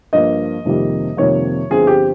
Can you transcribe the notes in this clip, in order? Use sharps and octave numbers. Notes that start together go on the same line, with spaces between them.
G2 F3 A#3 D#5
F2 C3 D#3 G3 A#3
F2 C3 D#3 G3 A#3 C#5
G1 G2 F3 C4 G#4
G4